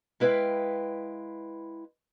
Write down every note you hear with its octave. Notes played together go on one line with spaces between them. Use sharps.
G#3 E4 B4 D#5 F5 G5